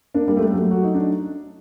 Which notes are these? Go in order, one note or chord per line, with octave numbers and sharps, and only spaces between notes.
A#3 D4
G3 A#3
A3
G3
F#3 A3
F#4
D#4
D4